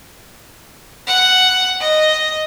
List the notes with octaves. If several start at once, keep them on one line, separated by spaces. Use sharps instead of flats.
F#5
D#5